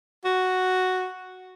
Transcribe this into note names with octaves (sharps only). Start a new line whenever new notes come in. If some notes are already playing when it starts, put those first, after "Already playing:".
F#4